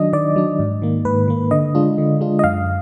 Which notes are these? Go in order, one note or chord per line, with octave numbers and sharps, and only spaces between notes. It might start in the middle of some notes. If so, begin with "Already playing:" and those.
Already playing: D#3 F#3 D4 D#5
D#3 D5
F#3 D4
G#2
D#3 A#3
G#2 B4
D#3 A#3
D3 D#5
G#3 D4 F4
D3
G#3 D4 F4
D#5
F#2 F5